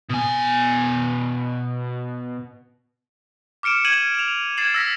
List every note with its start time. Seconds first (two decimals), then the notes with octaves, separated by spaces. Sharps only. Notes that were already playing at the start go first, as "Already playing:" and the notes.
0.10 B2 G#5
3.63 D6 F6 C#7 D7 E7
3.85 G#6 D#7 E7 F#7
4.15 E7 F7
4.57 G#6 A6 C7 E7 F#7
4.74 E6 A#6 B6